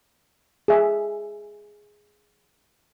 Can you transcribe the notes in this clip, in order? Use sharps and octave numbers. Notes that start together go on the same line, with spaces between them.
G#4 E5